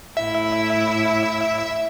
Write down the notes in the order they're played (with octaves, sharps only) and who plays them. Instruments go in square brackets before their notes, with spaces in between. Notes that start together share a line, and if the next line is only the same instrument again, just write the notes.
[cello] A2 E4 [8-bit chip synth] E5